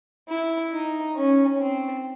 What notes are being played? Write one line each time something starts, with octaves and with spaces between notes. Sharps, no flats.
E4
D#4
C#4
C4